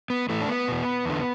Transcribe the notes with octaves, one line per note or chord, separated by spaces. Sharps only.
B3
A2 E3 A3
D4
B3
E2 B2
E2 D3